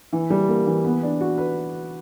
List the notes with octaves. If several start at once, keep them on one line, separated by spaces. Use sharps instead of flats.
E3
G3
A#3
E3
B3
D4
F#4
B4